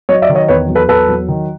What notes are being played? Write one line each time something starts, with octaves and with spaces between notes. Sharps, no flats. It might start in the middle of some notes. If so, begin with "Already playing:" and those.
F#3 C#5 D#5
D5 E5
D#3
C#5 D#5
E2 B4 C#5
F#3
A4 B4
E2 A4 B4
F#3
D#3